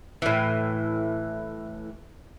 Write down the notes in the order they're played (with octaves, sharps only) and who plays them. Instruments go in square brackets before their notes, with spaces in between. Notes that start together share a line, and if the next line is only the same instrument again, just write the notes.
[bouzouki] A2 E3